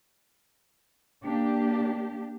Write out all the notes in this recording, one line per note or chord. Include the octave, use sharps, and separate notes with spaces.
A#3 D4 G4